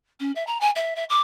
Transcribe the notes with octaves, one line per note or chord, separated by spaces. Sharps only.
C#4
E5
A#5
G#5
E5
E5
D6